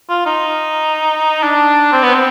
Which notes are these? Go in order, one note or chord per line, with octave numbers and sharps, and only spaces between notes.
F4
D#4
D4
C4
B3
C4